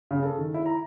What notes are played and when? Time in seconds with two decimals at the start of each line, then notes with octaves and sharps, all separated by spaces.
0.11 C#3
0.23 A4
0.38 D#3
0.54 E4
0.66 A#5